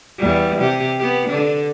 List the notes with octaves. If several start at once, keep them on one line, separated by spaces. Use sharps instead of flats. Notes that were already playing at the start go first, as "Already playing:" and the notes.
E2 G3
C3 G4
B3 G4
D3 D4